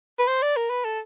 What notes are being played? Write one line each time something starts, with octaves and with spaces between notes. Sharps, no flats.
B4
C5
D5
A#4
B4
A4